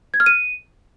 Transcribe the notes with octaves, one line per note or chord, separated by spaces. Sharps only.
G#6
F6
D#7